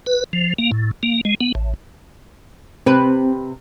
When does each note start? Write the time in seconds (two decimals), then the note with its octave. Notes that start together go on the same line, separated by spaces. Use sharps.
0.06 B4
0.33 F3
0.58 A#3
0.72 A2
1.03 A#3
1.25 G#3
1.41 B3
1.55 A1
2.86 C3 C4 B4